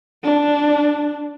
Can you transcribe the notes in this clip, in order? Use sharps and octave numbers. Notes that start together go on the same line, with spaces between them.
D4